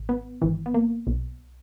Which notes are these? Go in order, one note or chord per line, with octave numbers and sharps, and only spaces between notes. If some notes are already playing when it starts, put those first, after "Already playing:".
Already playing: G#1 G#2
B3
G#1 G#2 E3
B3
A#3
B1 B2